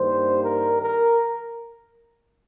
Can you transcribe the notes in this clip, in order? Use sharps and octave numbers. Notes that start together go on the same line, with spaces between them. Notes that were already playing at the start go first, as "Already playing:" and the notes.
Already playing: G2 D#3 G3 A#3 C5
A#4
A#4